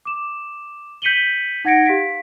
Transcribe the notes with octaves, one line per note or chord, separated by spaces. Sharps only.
D6 E7
G6 B6 C#7 D#7 F#7 G7
D#4 F#5 G#6 A#6 C#7 D7
G4 F5 B6 D7